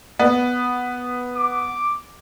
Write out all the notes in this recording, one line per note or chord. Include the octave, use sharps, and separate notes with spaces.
B3
D6